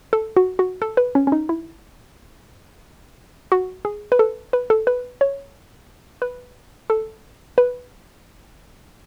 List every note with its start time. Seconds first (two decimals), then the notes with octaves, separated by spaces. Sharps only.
0.13 A4
0.37 F#4
0.59 F#4
0.82 A4
0.97 B4
1.15 C#4
1.27 C#4
1.32 D#4
1.49 E4
3.52 F#4
3.85 G#4
4.12 B4
4.19 A4
4.53 B4
4.70 A4
4.87 B4
5.21 C#5
6.22 B4
6.90 A4
7.58 B4